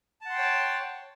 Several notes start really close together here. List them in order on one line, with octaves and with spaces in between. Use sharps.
A5 F#5 C6 G5 C#5